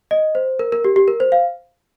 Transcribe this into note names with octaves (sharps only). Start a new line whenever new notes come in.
D#5
C5
A#4
A#4
G4
G4
A#4
C5
F5